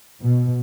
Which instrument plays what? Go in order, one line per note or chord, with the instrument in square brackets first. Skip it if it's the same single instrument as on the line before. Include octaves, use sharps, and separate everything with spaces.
[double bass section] B2